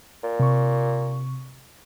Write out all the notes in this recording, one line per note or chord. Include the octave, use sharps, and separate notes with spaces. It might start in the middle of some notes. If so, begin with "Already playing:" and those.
A#2
C3 C#6